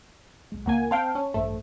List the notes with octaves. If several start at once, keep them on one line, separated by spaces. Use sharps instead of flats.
B1 G#3
C#2 A#3 F#5 G#5
C4 F5 G5 A5
C#4
A1 G2 A3 C5